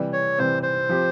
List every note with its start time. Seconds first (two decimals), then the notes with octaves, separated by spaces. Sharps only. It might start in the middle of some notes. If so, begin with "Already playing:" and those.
Already playing: C3 E3 G3
0.13 C#5
0.38 C3 E3 G3 C5
0.63 C5
0.89 F3 C4 G4